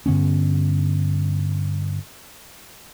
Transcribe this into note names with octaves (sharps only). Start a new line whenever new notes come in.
G2 D3 B3 C#4